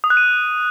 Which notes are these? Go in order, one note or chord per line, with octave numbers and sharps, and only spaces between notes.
D#6
F#6
D#7